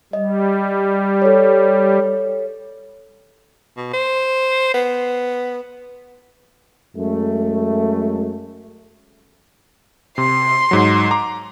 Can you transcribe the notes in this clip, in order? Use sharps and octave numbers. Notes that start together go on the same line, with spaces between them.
G3 D#5
A4 C#5
B2
C5
B3
F#2 G#3 A3
C3 C6
G#2 F#3
A#5 D6